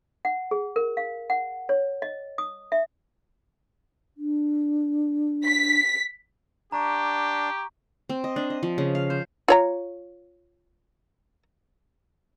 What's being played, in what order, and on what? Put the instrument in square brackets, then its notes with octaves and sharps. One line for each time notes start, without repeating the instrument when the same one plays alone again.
[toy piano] F#5
G#4
A#4
F5
F#5
C#5
D#5
D#6
E5
[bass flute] D4
[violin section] B6
[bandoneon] D4 [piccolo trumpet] G4 [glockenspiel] A#5 C#6
[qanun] C4
D#5
D4
D#5
F3
C#3
F5
C5
[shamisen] F4 C#5 A#5